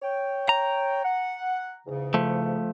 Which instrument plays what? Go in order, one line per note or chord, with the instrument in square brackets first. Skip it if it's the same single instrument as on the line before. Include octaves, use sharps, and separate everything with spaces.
[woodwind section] C#5 G5
[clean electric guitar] A#5
[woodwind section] F#5
E2 G#2 C#3
[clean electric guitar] F3 A3